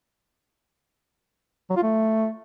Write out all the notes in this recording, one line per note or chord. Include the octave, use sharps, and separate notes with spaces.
F#3
F4
A3